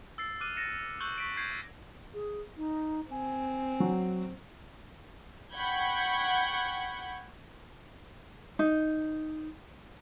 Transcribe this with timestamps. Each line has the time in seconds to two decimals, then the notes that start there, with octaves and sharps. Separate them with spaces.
0.18 E6 A6 C7
0.41 D6 F6 F#6 D#7
0.57 A6 A#6 C#7 E7
1.00 C#6 E6 F#6 G6 F#7 G7
1.18 C#6 B6 D7
1.37 C#6 G6 G#6 C7
2.14 G#4
2.57 D#4
3.11 C4 G#5
3.80 F#3
5.53 F#5 G5 B5 C#6 G6 G#6
8.59 D#4